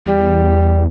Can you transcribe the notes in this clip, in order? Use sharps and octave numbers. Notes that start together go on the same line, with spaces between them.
E2 G3